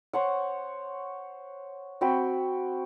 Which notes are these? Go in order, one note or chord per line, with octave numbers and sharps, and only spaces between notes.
C5 C#5 F#5
C4 F#4 G5 B5